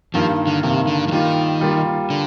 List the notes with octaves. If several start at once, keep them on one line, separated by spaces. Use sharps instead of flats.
G2 D#3 F3 A#3
D3
G2 C3 D#3 A#3
D3
F3
D#3 G3 A#3 F4
G3 A#3 F4
D3